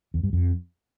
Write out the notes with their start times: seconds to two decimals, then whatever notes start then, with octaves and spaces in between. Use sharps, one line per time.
0.14 E2
0.23 G2
0.33 F2